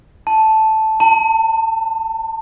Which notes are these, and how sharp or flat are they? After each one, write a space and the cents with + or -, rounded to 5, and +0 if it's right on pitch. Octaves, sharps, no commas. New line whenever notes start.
A5 -5
A5 +35